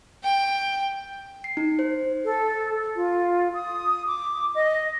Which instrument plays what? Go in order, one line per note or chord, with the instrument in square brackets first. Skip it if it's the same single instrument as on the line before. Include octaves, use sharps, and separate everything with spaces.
[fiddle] G5
[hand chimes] C7
D#4
C5
[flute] A4
F4
D#6
D6
D#5